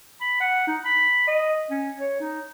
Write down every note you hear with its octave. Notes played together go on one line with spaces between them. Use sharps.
B5
F#5
D#4
B5
D#5
C#4
C#5
D#4